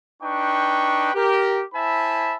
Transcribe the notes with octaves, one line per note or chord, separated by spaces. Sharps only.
D4 D#4 B4 G5 C#6
G4 A#4
E4 C5 E5 G#5 A5 B5